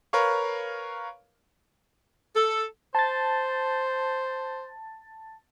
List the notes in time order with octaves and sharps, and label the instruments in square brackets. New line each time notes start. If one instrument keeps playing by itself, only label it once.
[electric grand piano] A#4 B4 C#5 F5 C#6
[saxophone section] A4
[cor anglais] C5 [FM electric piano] A5 A6